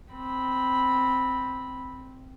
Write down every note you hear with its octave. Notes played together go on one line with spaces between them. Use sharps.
C4 B5